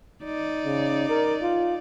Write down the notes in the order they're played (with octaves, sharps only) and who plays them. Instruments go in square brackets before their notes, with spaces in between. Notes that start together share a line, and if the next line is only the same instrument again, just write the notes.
[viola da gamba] D#4 D5
[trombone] C#3
A#4
F4